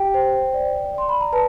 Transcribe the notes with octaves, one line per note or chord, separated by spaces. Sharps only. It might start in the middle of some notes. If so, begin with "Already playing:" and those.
Already playing: G4 G5
C5
D5
D5 C6
B5
A#5
B4 A5